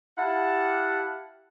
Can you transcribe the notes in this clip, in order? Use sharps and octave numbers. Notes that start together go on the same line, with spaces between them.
E4 G4 F5 F#5 A5